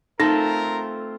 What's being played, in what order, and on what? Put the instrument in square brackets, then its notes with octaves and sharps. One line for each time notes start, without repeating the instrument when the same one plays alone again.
[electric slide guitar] A3 C4 F4 [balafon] D#4 [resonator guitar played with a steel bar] A4 [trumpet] A#4